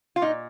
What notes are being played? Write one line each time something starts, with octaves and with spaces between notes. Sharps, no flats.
F4
A#2 D#4